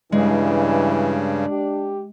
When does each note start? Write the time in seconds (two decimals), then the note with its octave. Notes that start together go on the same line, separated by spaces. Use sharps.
0.12 G2 C#3 E3 G#3 D4
1.49 G4